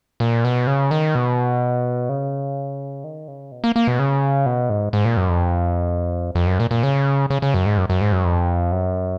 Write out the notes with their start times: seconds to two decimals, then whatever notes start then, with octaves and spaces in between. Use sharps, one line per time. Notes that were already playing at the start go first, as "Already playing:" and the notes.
0.20 A#2
0.44 B2
0.67 C#3
0.91 D#3
1.15 B2
2.09 C#3
3.04 D#3
3.28 C#3
3.52 B2
3.64 A#3
3.76 A#3
3.87 B2
3.99 C#3
4.46 B2
4.70 G#2
4.93 G#2
5.05 A#2
5.17 F#2
5.29 F2
6.35 F2
6.47 F#2
6.60 A#2
6.71 A#2
6.83 C#3
7.30 C#3
7.42 C#3
7.54 F#2
7.66 G#2
7.78 F#2
7.90 F#2
8.01 G#2
8.12 F#2
8.25 F2
8.72 F#2